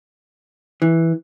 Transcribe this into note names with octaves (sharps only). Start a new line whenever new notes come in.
E3